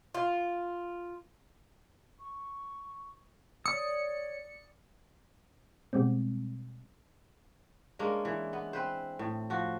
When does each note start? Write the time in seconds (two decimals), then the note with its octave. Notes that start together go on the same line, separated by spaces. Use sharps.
0.15 F4
2.20 C#6
3.66 C#5 D5 D#6 C#7
5.93 B2 G3 G#3 C4
7.99 G#3 A#3 C#4 D4
8.25 E3
8.53 B3
8.73 C4 B4 C5
9.19 A2
9.50 F3 F#4